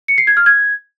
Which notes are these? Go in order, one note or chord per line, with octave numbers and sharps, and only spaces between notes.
C#7
C7
G#6
F6
G#6